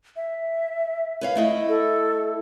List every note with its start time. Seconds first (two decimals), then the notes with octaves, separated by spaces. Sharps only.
0.16 E5
1.21 B4 C#5 F5
1.35 A3 E4 D#5
1.69 A4